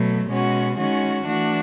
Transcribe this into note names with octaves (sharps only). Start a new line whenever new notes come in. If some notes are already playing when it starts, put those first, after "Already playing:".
Already playing: B2 F#3 A3
B2 G#3 C#4 F#4
D#3 G#3 C#4 F#4
E3 A3 D4 F#4